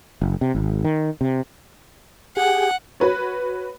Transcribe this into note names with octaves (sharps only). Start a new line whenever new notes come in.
F#1
C3
G#1
D#3
C3
G4 G#4 F#5
F#4 B4 C#5